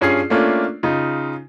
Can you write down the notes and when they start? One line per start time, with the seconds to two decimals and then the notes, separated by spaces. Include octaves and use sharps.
0.01 G2 C#4 F4 G#4 C7
0.30 A3 A#3 C#4 D4 F4
0.83 C#3 D#4 F4